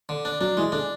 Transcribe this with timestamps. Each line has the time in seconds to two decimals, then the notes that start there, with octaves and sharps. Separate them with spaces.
0.09 D3
0.25 D4
0.40 F#3 D4
0.57 E3 G#3
0.72 D3 D4